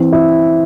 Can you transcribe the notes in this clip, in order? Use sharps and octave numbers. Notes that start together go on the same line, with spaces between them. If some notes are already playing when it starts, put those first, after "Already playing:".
Already playing: E3 C4
E4